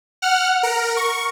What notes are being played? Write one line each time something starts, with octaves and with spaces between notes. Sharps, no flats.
F#5 F6
A#4
C#6